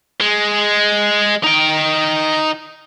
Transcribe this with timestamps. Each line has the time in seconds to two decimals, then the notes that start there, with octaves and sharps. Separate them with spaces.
0.21 G#3
1.44 D#4 G5